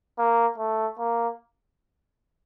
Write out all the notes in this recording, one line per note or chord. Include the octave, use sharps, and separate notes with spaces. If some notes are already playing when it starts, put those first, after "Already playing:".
A#3
A3
A#3